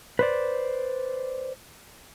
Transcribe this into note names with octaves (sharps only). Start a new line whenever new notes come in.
B4 C5 D5